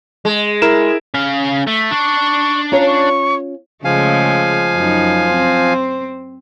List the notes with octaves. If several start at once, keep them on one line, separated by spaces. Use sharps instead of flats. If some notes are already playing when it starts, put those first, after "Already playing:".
G#3
E4 A#4 E7
C#3 F5
A3
D4 C#6
C#4 F4 C#5 A#5
C#6
C#3 F3 G#3 A3 F5 G#5
F#2 D#4
C4 C5